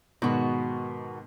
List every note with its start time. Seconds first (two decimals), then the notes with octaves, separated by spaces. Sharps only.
0.22 G#2 B2 D#3 B3 F#4